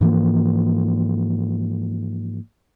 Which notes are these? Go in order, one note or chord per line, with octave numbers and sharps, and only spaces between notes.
G#2 E3 F3 A#3